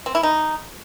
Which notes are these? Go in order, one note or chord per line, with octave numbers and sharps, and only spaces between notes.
C4
E4
D#4